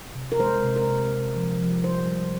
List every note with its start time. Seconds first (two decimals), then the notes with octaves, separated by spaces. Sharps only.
0.15 C3
0.32 A#4
0.40 G#3 C5
0.64 C3
0.76 A#4
0.87 C3
1.12 C3
1.35 F3
1.59 F3
1.84 G3 C5
2.07 G3